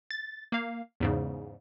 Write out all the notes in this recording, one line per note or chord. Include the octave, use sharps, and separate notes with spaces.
A6
A#3 F5
E2 G#2 C#3